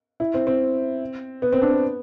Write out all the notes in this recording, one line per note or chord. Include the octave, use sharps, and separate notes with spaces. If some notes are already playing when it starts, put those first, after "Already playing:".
E4
C4
C4
B3
C4
D4
B3